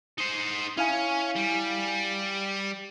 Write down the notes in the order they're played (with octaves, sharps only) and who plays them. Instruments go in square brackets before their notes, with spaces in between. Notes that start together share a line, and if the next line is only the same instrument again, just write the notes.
[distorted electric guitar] D#4 C5
[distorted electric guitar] C#4 [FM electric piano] E4 F5 G#5
[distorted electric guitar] G3